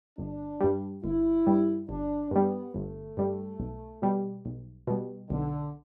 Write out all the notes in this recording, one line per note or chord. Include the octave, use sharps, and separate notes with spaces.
G1 D4
G2 G3
G1 E4
G2 G3
G1 D4
G2 G3 B3
G1 A3
G2 G3
B1
B2 G3
B1
B2 G3
B1 D3